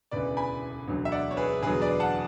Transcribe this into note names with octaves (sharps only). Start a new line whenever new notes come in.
E1 D2 C#3 E3 B4 D5
G#5 B5
E1 D2 D3 F#3
E5
D5 F#5
C#5
G#4 B4
E1 E2 D3 F#3 G#4 B4
B4 D5
F#5 A5